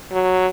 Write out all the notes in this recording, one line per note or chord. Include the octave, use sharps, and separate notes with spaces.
F#3